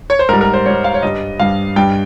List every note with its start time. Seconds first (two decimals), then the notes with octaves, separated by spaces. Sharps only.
0.10 C#5
0.19 C5
0.29 G#2 A#4
0.33 G3
0.41 A#4
0.53 C5
0.66 G#2 G3 C#5
0.84 F5
0.94 C#5
1.02 G2 G3 D#5
1.40 G2 G3 F5
1.76 G2 G3 G5